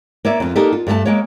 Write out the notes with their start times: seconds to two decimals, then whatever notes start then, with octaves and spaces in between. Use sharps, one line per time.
0.25 A#3 C#5 D5 E5
0.40 F2 F4
0.56 A#3 D4 D#4 G4 A4
0.73 F4
0.87 G2 A3 A#4 A5
1.05 G#3 A#3 C#5